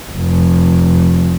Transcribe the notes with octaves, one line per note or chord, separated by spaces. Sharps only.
F1